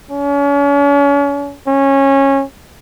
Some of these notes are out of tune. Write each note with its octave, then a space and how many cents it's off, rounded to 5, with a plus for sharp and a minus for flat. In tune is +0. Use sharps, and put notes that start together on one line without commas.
C#4 +35
C#4 -15